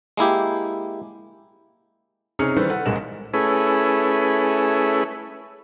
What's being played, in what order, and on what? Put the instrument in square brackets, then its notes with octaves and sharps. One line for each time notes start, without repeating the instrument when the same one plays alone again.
[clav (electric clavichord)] G#3 A#3 E4 G4
[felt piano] C3 C#4 D#4 G#4 F6 C#7
D#3 E3 G3 A4 B4 C5
A4 B4 F#5
B1 G#2 G#3 A#4 D#5 E7
[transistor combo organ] A3 C#4 E4 G#4 B4